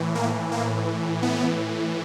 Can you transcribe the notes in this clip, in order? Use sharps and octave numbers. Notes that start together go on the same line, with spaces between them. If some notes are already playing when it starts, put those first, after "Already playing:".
Already playing: A2 E3
A#3
A#3
B3